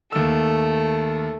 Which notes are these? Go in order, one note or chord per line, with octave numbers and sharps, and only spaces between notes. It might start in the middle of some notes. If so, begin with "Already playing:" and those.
D#2 A3 E6